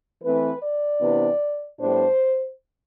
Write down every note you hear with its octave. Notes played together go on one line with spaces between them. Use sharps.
E3 A3 C4 B4
D5
C3 E3 B3 D4
A2 G3 B3 D4 C5